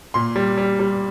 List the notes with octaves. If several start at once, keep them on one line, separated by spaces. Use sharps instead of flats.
A#2 C6
G3
G3
G3